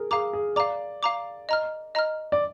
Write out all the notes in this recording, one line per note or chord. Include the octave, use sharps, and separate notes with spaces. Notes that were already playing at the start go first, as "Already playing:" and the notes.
Already playing: G#4 A#4
G#4 F5 A#5 D6
G#4
D5 F5 A#5 D6
F5 A#5 D6
D#5 A#5 F6
D#5 A#5 F6
D5